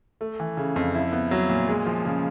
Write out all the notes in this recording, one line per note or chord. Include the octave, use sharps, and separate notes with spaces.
A3
E3
C#3
F2
E4
B3
F#3
A#2
G#3
F3
C#3